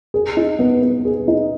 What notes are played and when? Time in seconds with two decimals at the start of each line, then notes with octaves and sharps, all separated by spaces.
0.14 G#4
0.37 D#4
0.59 B3
0.82 B3
1.05 G#4
1.28 D#4